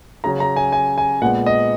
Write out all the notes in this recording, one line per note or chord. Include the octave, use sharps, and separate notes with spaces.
C#3 F#3 C#4 A#5
A#5
G#5
G#5
G#5
A#2 G#3 B3 F#5
D#5